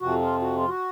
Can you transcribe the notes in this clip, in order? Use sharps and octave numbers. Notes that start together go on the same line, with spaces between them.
F2 C3 F3 F#4
F4
F#4
F4
F#4